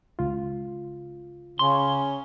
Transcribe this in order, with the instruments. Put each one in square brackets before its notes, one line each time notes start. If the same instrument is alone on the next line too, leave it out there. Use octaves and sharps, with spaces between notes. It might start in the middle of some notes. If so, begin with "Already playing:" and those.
[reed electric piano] C#2 F4
[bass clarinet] C#3 [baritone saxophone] C#4 [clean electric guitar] C6